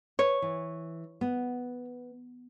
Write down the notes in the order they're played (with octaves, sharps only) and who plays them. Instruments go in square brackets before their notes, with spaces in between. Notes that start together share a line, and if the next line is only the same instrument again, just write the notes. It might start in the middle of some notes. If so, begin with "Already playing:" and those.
[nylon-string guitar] B4 [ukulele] C#5
[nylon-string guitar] E3
B3